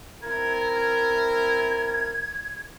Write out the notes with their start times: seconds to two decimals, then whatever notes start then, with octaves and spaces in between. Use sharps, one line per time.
0.22 C4 E4 A#4 G#6
0.74 G#6